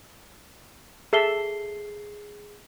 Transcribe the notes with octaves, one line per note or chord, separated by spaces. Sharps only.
G#4 A4 E5 C7 G7